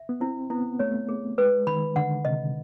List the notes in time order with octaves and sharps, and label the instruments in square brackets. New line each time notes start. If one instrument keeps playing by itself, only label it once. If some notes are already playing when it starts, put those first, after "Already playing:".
Already playing: [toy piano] E5
[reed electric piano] B3
[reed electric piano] C4 [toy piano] E4
[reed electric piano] B3 [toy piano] E4
[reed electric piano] A3 [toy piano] C#5
[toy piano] G#4
[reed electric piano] G#3 [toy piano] B4
[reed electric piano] D#3 [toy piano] B5
[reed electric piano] D3 [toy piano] F#5
[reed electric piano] C3 [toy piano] D#5